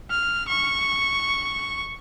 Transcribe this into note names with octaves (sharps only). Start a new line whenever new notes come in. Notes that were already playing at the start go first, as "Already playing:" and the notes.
F6
C#6